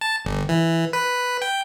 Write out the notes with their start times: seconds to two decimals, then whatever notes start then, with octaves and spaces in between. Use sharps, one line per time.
0.01 A5
0.25 G1
0.49 E3
0.93 B4
1.42 G5